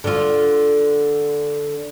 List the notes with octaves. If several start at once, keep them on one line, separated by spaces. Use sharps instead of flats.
D3 F4